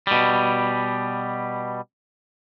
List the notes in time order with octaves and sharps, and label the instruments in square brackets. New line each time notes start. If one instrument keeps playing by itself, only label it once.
[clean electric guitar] B2 G3